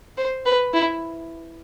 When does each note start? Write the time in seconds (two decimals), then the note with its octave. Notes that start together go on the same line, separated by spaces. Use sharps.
0.18 C5
0.46 B4
0.74 E4